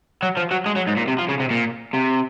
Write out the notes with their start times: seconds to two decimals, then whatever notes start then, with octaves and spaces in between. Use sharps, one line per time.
0.23 F#3
0.37 F3
0.51 F#3
0.66 G#3
0.76 F#3
0.87 G#2
0.97 A#2
1.08 C3
1.19 F3
1.29 C#3
1.40 C3
1.51 A#2
1.93 C3